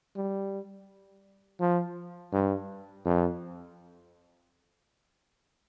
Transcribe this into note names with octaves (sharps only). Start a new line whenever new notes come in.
G3
F3
G2
F2